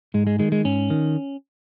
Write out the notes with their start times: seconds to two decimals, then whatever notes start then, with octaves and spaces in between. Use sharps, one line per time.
0.14 G#2 G#3
0.27 G#3
0.39 D#3 G#3
0.52 G#3
0.64 G#2 C#4
0.90 D#3